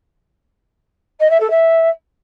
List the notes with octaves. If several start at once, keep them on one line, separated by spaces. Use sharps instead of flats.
D#5
E5
A4
E5